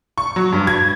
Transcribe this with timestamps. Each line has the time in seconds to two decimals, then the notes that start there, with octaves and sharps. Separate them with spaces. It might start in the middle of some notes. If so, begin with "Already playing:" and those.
0.18 C#6
0.36 F#3
0.52 G2
0.67 G#6